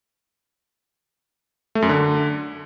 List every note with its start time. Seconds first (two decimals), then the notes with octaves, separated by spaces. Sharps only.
1.75 A3
1.82 F#2
1.89 D3